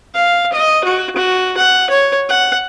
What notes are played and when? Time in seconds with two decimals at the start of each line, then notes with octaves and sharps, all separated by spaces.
0.14 F5
0.53 D#5
0.84 F#4
1.16 F#4
1.57 F#5
1.90 C#5
2.29 F#5